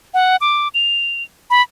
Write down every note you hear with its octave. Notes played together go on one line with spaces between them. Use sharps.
F#5
D6
F7
B5